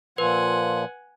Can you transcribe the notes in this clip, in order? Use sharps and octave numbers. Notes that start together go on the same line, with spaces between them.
A#2 F3 B4 F#5 G#5 C6